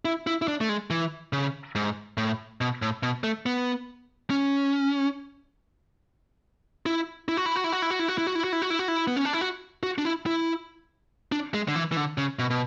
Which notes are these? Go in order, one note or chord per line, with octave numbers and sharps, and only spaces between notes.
E4
E4
E4
D4
A3
G#3
E3
C#3
G#2
A2
B2
A2
B2
A3
B3
C#4
E4
E4
F#4
E4
F#4
E4
F#4
E4
F#4
E4
F#4
E4
F#4
E4
F#4
E4
F#4
E4
F#4
E4
B3
C#4
D4
E4
F#4
F#4
D4
E4
E4
D4
G#3
D3
E3
E3
D3
C#3
B2
B2